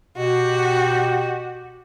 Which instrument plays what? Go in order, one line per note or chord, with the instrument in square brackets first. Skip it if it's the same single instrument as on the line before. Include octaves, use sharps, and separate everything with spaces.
[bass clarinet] B2 [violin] F#4 [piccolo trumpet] G4